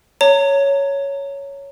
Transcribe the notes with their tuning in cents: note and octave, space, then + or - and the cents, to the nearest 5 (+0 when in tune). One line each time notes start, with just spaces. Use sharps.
C#5 +5 A#5 -30